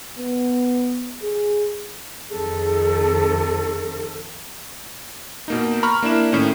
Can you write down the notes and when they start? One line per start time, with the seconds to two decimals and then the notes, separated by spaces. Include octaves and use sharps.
0.18 B3
1.23 G#4
2.30 F2 D#3 G#4 A4
5.48 B2 A#3 D#4
5.83 A#5 B5 C#6 F6
6.03 A#3 D4 E4 E7
6.32 A2 D#3 C#4